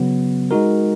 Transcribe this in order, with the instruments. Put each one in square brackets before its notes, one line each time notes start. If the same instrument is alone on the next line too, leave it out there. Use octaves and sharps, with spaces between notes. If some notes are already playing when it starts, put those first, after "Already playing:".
Already playing: [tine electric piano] C#3 F#3 B3
G#3 D#4 F#4 A#4